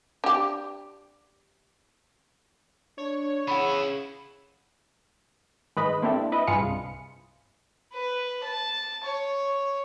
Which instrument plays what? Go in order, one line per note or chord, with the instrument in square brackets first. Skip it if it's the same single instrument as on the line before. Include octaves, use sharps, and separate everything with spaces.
[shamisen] D4 G4
[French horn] D4 [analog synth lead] C#5
[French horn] C#3 [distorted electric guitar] B3 E4 [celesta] F#5 B5
[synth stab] G#2 D#3 B4 D#5 B5
A#3 C4 D4 E4 G4 A4
E4 B4 D#5
G2 F4 G#4 B4 F5 C#7
C2
[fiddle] B4
A5
C#5